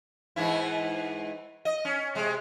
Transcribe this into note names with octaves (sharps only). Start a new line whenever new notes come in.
G#2 E3 E4
D#5
C#4
C3 G#3